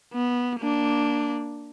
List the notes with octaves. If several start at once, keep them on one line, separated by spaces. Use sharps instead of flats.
B3
A#3 D4